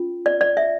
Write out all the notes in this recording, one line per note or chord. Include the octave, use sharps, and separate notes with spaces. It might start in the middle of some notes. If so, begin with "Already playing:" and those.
Already playing: C#4 F4
D5
D5
E5